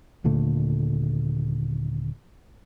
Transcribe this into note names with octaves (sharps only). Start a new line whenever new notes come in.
D#1 A#2 D3 A3